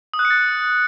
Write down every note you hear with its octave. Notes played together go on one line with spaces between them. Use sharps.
D#6
F#6
C#7
A6